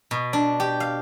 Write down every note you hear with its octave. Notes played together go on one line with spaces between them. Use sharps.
B2
D4
G4
F5